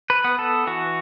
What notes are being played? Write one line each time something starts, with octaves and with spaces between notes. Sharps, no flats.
B4
B3
A4
E3 F#4